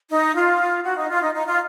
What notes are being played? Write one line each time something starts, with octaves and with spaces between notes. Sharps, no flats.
D#4
F4
F#4
D#4
F4
D#4
D#4
F4